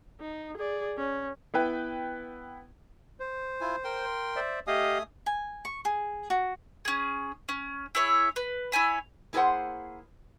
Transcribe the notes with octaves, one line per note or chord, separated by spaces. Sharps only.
D#4
G#4 D5
C#4
B3 E4 B4 G5
C5
E4 F4 G#5
A#4 G5 C6
C5 D5 E5
A3 G4 D#5 F5 G#5 D#6
G#5
C#6
G#4
F#4
C#4 G#4
C#4
E4 G#4 C#5 E5
B4
E4 C#5 G#5 B5
A#3 E4 G#4 A4 C5 F#5